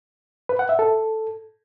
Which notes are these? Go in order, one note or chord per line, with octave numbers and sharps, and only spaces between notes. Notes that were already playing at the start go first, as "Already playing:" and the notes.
B4
F#5
E5
A4